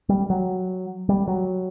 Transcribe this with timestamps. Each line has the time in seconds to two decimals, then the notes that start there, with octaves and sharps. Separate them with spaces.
0.09 G3
0.30 F#3
1.09 G3
1.28 F#3